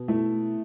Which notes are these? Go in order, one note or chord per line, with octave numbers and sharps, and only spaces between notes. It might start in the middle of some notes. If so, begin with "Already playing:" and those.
Already playing: B2
A3 E4